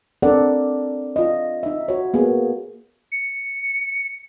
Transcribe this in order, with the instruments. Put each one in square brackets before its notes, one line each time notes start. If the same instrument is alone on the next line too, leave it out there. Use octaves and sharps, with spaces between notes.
[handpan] C4 D4 A4 A#4 D5 F#5
F4 D#5
D#4 E5
F#4 C#5
A#3 B3 F#4 G#4
[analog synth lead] C#7